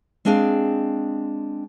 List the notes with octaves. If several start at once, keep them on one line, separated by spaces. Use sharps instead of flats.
G#3 C4 D4 G#4 F5